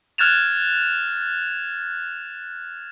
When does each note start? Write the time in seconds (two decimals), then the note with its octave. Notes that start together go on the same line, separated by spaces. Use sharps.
0.18 F6 F#6 G#6 A6 E7 F7